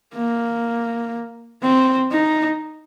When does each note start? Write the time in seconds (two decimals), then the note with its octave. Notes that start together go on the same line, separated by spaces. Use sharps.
0.14 A#3
1.62 C4
2.11 D#4